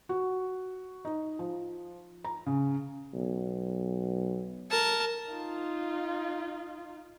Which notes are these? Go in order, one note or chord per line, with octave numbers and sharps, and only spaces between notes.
F#4
D#4
F3
A#5
C#3
B1
A#4 A5
D#4 F4